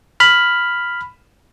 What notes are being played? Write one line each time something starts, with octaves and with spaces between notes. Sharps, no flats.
B5 F6